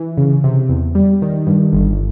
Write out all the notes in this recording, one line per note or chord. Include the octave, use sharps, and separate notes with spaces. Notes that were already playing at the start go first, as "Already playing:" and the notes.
Already playing: E3
C#3
C3
E2
G3
D#3
G2
G1